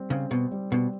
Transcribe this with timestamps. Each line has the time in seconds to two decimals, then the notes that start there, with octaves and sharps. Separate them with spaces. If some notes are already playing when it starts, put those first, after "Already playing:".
Already playing: G3 C4
0.10 C#3 C4
0.31 B2
0.51 G3
0.72 B2